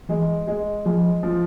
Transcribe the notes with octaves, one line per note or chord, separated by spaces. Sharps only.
E3 G#3
G#3
F3 G#3
F3